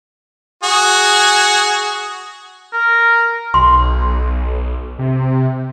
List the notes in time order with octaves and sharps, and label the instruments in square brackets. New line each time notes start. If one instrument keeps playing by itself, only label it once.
[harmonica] F#4 G#4
[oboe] A#4
[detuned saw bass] B1 [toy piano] C6
[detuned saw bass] C3